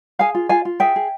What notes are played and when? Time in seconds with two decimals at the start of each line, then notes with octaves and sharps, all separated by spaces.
0.19 G#4 F5 G#5
0.35 F4
0.49 F4 F5 G#5
0.65 F4
0.80 G#4 E5 G5
0.96 G#4